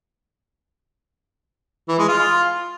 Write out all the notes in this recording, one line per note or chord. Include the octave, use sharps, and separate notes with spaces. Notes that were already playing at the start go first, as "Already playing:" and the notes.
E3
G#3
F4